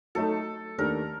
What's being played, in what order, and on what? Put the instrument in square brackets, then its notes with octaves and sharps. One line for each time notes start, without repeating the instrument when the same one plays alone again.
[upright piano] F#3 A3 D#4 [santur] A4
[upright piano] D#2 D#3 A3 D4 G4 [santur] A#4